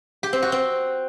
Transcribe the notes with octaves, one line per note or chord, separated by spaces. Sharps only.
G4
C4
F#4
C4